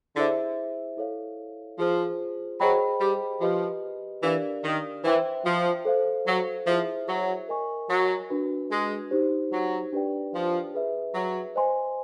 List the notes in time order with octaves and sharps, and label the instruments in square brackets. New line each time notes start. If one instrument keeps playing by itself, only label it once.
[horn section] D3 [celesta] E4 G#4 C5 E5
[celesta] E4 A4 C#5 F5
[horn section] F3 [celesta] F4 G#4 C5
[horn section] F#3 [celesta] G#4 C5 D#5 G5 B5
[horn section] G3
[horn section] F3 [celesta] G4 B4 D#5
[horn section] E3 [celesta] D4 G4 A#4 D5 F5
[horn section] D#3
[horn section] E3 [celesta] C5 E5 G5 C6
[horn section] F3
[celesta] A4 C5 F5
[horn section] F#3
[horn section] F3 [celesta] E4 G#4 C5 E5
[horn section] F#3
[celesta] A#4 D#5 G#5 C#6
[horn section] F#3
[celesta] D4 F#4 B4
[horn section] G#3
[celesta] D#4 G4 C5
[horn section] F#3
[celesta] D4 G4 B4 D5 G5
[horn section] F3
[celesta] G#4 B4 E5
[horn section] F#3
[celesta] C5 D#5 G#5 C6